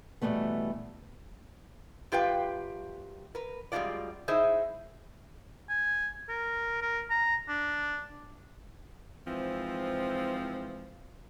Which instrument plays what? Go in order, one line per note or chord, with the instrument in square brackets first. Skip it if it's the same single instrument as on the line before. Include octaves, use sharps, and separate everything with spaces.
[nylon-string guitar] B2 D3 E3 G3 A3 B3
[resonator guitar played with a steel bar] F#2 F4 G4 B4 F5 G5
A#4 B4
F#2 G3 G#3 D4 F4 D5
D#4 E4 G#4 C5 D#5 E5
[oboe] G#5
A#4
A#4
A#5
D4
[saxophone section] G#2 E3 F3 C4